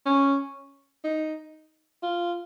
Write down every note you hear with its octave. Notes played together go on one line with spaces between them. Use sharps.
C#4
D#4
F4